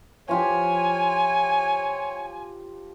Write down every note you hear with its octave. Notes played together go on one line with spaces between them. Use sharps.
F3 F4 G4 C#5 G#5